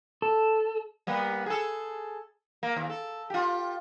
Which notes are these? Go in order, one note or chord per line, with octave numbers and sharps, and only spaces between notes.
A4
G3 A#3 B3
G#4 A4
A#3
D#2
A4
F4 G4